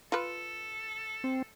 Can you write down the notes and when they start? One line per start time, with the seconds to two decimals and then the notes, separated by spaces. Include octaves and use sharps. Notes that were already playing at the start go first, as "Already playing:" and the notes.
0.12 F4 A4 B4
1.24 C4